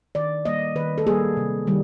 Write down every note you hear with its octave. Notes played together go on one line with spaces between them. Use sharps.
D#3 D5
G3 A#3 D#5
D#3 B4
A4
G3 A#3 G#4
C3
D#3 G3